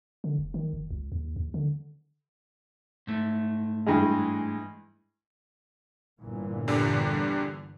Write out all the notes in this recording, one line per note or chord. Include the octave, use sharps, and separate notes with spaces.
D3
F1
D#3
F#1
C#2
D#2
D#2
D3
G#2 A3
G2 E3 G#3
G1 A#2 E3
E2 D3 G3